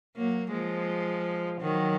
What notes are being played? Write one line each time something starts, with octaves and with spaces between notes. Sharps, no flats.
F#3 A#3
F3 G#3
D#3 F#3